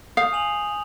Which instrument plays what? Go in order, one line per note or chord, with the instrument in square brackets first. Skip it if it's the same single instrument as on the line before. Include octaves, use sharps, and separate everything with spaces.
[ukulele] F5 [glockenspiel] D#6 G6
[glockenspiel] G#5 F7 F#7